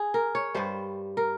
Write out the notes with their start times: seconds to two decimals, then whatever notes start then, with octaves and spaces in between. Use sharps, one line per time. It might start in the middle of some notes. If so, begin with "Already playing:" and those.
Already playing: G#4
0.14 A#4
0.35 C#5
0.55 G2 G3 C5
1.17 A#4